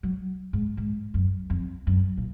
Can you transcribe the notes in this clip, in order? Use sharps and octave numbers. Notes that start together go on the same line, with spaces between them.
F#3
G#2
G#2
F#2
F2
F#2
A#2